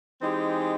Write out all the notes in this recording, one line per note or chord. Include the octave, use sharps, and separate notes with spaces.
E3 G#3 C4 D#4 G4